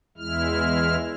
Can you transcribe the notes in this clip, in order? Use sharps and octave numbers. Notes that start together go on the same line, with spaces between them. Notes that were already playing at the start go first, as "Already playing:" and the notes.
E2 G#3 E4 F6